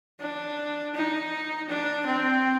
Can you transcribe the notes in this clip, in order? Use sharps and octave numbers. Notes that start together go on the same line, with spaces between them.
D4
D#4
D4
C4